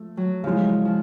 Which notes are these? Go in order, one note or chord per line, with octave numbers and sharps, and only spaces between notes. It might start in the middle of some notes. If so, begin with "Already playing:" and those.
Already playing: F3 A3
F#3
C#3 E3 F3 G#3
F3